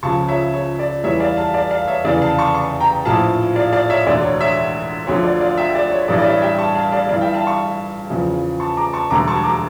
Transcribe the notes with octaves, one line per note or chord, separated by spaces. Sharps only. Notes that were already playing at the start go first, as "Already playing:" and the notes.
C#2 C#3 F3 A5 C#6
C#5 E5
C#5
D5
E2 E3 G3 C#5 E5
D5 F5
F5 A5
D5 F5
D5 F5
C#5 E5
F1 E2 C#3 E3 D5 F5
F5 A5
A5 C#6
A5 C#6
G5 A#5
A#1 A2 F3 F5 A5
D5 F5
D5 F5
C#5 E5
E1 D2 D3 D5
C#5
C#5 E5
D2 D3 F3 C#5
D5
D5 F5
E5 G5
D5
C#5
A1 G2 E3 G3 D5
D5
C#5 E5
E5 G5
A5 C#6
F5 A5
D5 F5
G1 G2 E3 D5 F5
E5 G5
F5 A5
A5 C#6
E2 C#3 F3
A5 C#6
A#5 D6
A5 C#6
E1 D2 D3 G3 A#5 D6
A5 C#6
A#5 D6